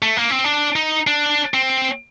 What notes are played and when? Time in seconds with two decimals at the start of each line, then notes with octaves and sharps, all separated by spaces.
0.02 A3
0.17 A#3
0.30 C4
0.44 D4
0.76 D#4
1.07 D4
1.54 C4